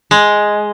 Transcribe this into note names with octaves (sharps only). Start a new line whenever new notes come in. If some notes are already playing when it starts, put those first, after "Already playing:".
G#3